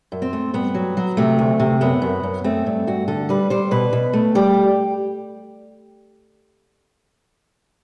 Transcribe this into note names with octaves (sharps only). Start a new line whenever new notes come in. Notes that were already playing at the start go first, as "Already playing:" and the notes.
F#2
C4
A3
G2 B3
F#3
F#3
C3 A3
D2
C3
F#2 B3
F#2
F#2
A3 C4
G2
G2 F#4
D3 A4
G3 B4
G3 C5
B2 B4
B2
A3
G3 G4